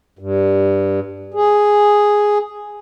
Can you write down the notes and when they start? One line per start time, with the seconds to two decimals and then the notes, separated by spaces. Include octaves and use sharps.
0.19 G2
1.34 G#4